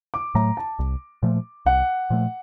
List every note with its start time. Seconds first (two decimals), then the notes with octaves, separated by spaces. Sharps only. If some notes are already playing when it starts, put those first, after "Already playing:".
0.14 D6
0.35 A2 F#3 A3 A#5
0.57 A5
0.79 C2
1.23 A#2 F3 A3
1.66 C2 F#5
2.10 A#2 F3 A3